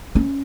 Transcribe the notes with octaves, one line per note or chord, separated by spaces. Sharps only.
C#4